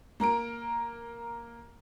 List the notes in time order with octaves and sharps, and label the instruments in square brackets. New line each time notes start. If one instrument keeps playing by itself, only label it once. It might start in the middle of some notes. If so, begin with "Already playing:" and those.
[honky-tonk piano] A#3 A#4 A#5 D7